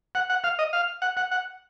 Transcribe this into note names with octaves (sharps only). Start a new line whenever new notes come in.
F#5
F#5
F5
D#5
F5
F#5
F#5
F#5